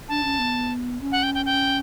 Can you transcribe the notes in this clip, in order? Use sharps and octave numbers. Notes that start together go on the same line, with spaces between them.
D4 A5
C#4
B3
C#4
F#5
G5
G5
G5